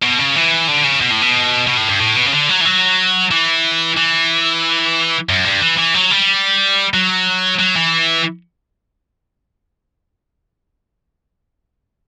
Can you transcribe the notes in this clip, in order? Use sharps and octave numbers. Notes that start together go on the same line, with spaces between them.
B2
C#3
E3
D3
C#3
B2
A2
B2
B2
A2
G2
A2
B2
C#3
D3
F#3
E3
F#3
E3
E3
F#2
G2
E3
E3
F#3
G3
F#3
F#3
E3